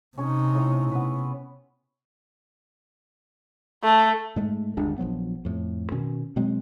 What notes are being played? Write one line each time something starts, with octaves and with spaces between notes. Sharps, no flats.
C3 C#4 D#4 C#5
A2
C3 B3 B4
A3
G#2 G#3 A3
G1 D#2 G#3 D4
A#1 F3 F#3 B3
F2 A2
B2 D#3 C#4
B2 F#3 G#3 C4